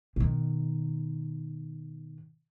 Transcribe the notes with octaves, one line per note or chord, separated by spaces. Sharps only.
B2 D#3